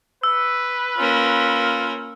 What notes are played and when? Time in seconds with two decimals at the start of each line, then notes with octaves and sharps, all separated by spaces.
0.23 B4 E6
0.98 A#3 C#4 F4